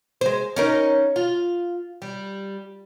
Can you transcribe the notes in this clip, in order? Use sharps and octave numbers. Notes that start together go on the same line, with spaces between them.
G#3 C5
C#4 D#4 A#4
F4
G3